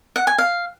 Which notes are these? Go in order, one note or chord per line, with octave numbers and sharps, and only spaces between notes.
F#5
G#5
F5